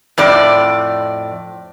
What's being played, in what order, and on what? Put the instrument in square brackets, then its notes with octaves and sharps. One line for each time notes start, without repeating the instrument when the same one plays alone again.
[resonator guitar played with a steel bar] F2 A2 D5